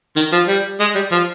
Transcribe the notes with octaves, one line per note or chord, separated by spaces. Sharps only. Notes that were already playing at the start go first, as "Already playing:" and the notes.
D#3
F3
G3
G#3
G3
F3